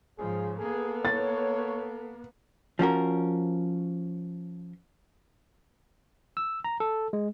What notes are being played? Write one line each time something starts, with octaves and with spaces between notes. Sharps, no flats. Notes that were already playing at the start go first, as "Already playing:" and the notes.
G#2 C#3 F3 G#4
A#3 B3 G#4 A4
C#5 A6
F3 C#4 F#4 A#4
E6
A#5
A4
G#3